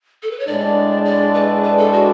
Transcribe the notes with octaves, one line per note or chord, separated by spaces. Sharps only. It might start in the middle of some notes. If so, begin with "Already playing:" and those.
A4
B4
C#5
A2 G#3 D4 D5
D5
B4
B4
A4
F#4